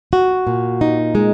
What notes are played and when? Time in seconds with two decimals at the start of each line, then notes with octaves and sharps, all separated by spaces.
0.13 F#4
0.47 A#2
0.81 D#4
1.15 G#3